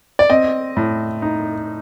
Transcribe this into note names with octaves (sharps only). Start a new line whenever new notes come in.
D5
C4 D#5
A2
D#4